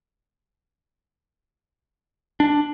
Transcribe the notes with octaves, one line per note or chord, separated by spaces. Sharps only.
D4